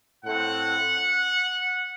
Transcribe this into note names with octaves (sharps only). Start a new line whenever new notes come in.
A2 A3 C4 F#5